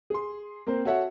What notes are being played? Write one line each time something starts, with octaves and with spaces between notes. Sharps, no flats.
G#4 C6
A#3 C4 A#4 C5
F#4 A4 C#5 E5 F#5